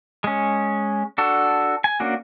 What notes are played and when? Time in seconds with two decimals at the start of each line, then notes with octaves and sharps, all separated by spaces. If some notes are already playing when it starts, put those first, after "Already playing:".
0.24 G#3 C#4
1.18 D4 F#4 A4
1.84 G#5
2.00 A#3 C#4 D4 F#4